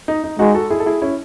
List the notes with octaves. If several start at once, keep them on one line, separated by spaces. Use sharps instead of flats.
D#4
D#4
G#3 D#4 F#4
F#4 A4
E4 G#4
A4
E4 G#4
C#4 E4